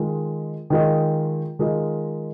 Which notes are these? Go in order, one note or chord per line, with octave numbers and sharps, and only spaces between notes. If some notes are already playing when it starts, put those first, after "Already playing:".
Already playing: D#3 G#3 F4 A#4 D#5
D#3 G#3 F4 A#4 D#5
D#3 G#3 F4 A#4 D#5